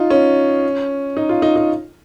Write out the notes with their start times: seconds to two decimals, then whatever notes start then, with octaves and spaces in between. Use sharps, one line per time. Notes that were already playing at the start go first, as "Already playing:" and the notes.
Already playing: D#4 F4
0.10 C#4
1.17 D#4
1.29 F4
1.42 D#4
1.56 D#4